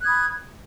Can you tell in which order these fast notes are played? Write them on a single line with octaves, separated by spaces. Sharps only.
F#6 G#6 D#6 B5